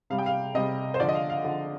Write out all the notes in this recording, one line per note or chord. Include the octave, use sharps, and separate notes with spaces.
C3 G3 F5
G5
F5
C3 G3 D#5
C5
D3 F3 D5
D#5
F5
F5
D3 F3